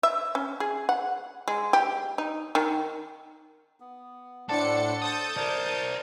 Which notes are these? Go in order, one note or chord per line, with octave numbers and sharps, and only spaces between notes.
E5
C#4
G#4
F#5
G#3
G4
D#4
D#3
B3
A2 D4 A4 C5 D5 F#5 C#7
C5 A5 D#6 G6 A6
A#4 C5 D5